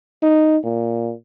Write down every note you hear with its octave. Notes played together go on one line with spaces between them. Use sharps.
D#4
A#2